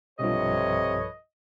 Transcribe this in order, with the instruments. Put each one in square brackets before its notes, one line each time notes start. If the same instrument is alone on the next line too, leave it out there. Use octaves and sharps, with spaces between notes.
[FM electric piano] B1 G2 F3 [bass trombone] C3 [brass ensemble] A4 B4 C#5 [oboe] D#5